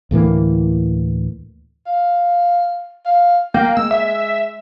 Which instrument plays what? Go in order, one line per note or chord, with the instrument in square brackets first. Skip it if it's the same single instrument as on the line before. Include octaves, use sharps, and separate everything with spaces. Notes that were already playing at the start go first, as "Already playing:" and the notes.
[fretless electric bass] D2 A2 E3 A#3
[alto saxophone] F5
F5
[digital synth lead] A#3 [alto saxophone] G5
[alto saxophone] G#3 [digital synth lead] E6
[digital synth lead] E5